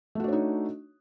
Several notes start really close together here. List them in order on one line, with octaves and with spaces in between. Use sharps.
A3 F#4 D4 C#5 D#4